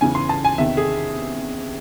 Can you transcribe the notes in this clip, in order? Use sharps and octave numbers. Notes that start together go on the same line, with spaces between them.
E2 C#3 E3 G#5
C6
A5
G#5
E2 C3 D#3 E5
G#4